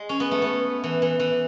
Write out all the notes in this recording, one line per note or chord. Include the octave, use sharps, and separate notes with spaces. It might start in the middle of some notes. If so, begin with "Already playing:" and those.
Already playing: G#3
C#4
B3
A3
B3
E3
E3
E3